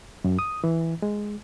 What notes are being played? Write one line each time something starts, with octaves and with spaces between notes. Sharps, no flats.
F#2
D#6
E3
G#3